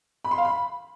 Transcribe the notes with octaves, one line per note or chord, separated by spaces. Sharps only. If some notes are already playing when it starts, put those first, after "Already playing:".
B5
C6
F5
B5